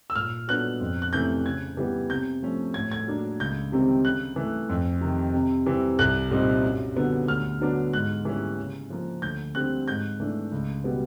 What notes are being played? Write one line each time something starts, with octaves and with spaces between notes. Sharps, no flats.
E6
A#2 F6
F#3 B3 D4 F#6
F2
F#6
C3 E3 A3 C#4 G6
C#3 G#6
E3 G3 B3
C3 G6
F3 A3 C#4
A2 G#6
G#6
F#3 A#3 D4
C#2 G6
C3 D#3 G3 C4
C#3 F#6
E3 A3
F2
C3 D#3
C3
E3 G3 C4
C2 F#6
A#2 G3 C4 D#4
F#2
D3 F#3 B3
D2 F6
D3 F#3 B3 D4
G#2 F#6
E3 G3 A#3 C#4
C#3
F3 A#3
D2 G6
D3 G3 C4 F#6
G#2 G6
E3 A3 D4
C#2
B2 G3 B3